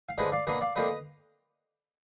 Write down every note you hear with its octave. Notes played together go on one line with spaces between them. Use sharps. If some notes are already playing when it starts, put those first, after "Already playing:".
F5
D3 F3 G#3 D4 B4 D#5
D5 F5
B2 A#3 D4 B4 D#5
D5 F5
F2 F3 A#3 D4 B4 D#5